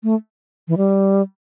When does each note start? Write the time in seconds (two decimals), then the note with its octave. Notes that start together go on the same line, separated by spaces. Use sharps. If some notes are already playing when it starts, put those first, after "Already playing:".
0.03 A3
0.68 E3
0.77 G3